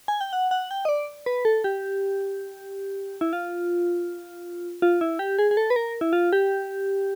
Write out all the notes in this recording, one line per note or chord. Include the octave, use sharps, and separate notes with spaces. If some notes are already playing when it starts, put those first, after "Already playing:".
G#5
G5
F#5
F#5
G5
D#5
D5
B4
A4
G4
E4
F4
F4
E4
G4
G#4
G#4
A4
B4
A#4
E4
F4
G4